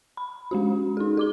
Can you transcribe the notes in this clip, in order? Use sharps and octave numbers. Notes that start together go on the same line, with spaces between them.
B5
G#3 C#4 F#4
D#4 G#4
G#4 D6 G7